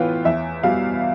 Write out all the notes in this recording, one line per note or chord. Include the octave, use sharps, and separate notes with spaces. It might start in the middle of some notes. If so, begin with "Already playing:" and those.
Already playing: A2 E3 B3 F4 F5 G5
E2 E5
B2 G3 F5